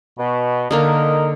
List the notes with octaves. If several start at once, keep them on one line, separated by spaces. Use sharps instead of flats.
B2
D3 A#3 D4 D#4 A#4 D#5